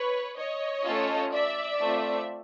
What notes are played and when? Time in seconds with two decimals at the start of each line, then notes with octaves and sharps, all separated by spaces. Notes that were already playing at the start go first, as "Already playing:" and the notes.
Already playing: B4 C#5
0.38 C#5 D#5
0.85 A3 C#4 F4 A4
1.33 D5 E5
1.80 A3 C4 F4